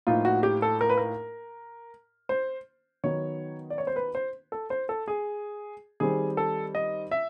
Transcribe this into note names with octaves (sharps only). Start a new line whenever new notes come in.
A2 F3 A#3 D#4 F4
F#4
G4
A4
A#4
B4
A#4
C5
D#3 F#3 B3 D#4 C#5
D5
C#5
C5
B4
C5
A4
C5
A4
G#4
D#3 G3 C4 G#4
A4
D#5
E5